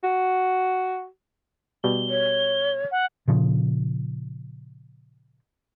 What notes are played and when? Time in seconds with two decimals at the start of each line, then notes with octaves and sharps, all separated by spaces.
0.04 F#4
1.84 B2 G3 G7
2.10 C#5
2.91 F#5
3.28 A#2 C#3 F3